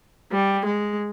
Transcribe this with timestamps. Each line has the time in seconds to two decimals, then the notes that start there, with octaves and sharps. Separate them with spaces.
0.31 G3
0.66 G#3